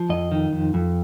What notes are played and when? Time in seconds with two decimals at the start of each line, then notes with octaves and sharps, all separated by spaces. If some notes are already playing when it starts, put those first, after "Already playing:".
Already playing: F3
0.09 F2 D#5
0.32 D#3
0.52 F2
0.74 F2